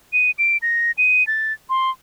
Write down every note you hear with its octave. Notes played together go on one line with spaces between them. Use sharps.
D#7
D7
A#6
D#7
A6
C6